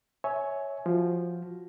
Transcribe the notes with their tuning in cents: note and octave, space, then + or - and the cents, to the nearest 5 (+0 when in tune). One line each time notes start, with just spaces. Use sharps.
C#5 +0 E5 -15 G#5 +10
F3 +0 F#4 +0